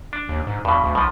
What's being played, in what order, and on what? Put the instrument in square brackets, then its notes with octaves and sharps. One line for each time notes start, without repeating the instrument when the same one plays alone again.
[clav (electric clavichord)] D4
[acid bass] D#2
G#2
[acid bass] E2 [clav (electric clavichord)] G2 B2
[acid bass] D2
[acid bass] B1 [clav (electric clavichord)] B2 F3